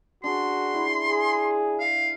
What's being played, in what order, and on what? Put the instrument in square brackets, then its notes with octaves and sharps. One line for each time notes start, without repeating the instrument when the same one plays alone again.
[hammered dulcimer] D4 G#4 [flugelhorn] F#4 [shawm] C6
[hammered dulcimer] E4 B5
[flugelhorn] G#4
[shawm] F5